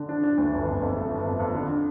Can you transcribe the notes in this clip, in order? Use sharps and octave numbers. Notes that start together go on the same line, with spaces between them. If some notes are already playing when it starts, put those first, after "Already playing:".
Already playing: D3
D4
D4
D2
G1
F2
F2
A3
G1
F2
F2
D3